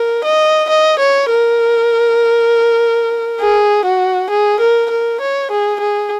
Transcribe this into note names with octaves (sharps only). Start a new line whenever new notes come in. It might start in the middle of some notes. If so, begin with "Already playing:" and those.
Already playing: A#4
D#5
D#5
C#5
A#4
G#4
F#4
G#4
A#4
A#4
C#5
G#4
G#4